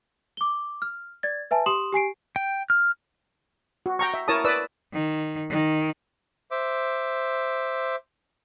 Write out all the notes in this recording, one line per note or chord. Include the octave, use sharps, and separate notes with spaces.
D6 G7
F6
D5 G#6 A6
B4 E5 G#5 A5
G4 C6 D#6 E7 F#7
G4 G#5 C7 D7
G5
F6
F#4
G5 A#5 C#6
E5
E4 A#4 C#5 A5 A#5 D#6
B4 D5 D#6 E6
D#3
D#3
C5 E5 D6